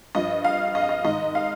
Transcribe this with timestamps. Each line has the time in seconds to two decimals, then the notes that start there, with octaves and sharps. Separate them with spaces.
0.15 G2 F3 D#5
0.45 F5
0.75 D#5
0.82 F5
0.89 D#5
1.04 G#2 D#3 D#5
1.35 F5